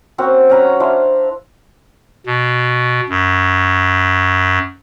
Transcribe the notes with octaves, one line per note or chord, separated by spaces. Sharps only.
A#3 C4 C#4 F#4
F#3 C#4 A#5 B5
D4 E4 C5 F5
B2
F#2